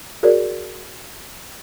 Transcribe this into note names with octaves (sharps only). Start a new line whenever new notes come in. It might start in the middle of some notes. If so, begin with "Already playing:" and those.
F#4 G#4 A#4 C#5 D5